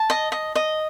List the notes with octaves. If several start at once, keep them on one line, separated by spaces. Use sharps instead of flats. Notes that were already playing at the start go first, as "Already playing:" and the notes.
Already playing: A5
D#5
D#5
D#5